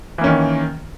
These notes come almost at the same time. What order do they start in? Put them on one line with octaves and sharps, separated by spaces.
E3 A#3 C#4 D#3